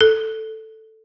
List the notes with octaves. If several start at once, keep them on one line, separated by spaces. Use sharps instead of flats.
A4